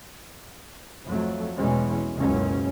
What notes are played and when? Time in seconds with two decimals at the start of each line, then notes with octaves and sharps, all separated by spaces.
1.06 F2 F#3 A3
1.57 E2 B2 E3 G#3 C#4
2.16 F#1 C#2 F#2 B2 C#4